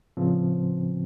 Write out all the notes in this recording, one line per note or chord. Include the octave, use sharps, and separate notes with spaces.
A2 C#3 F3 B3 C4